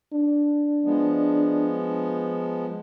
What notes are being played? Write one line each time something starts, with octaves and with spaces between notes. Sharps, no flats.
D4
F3 G#3 B3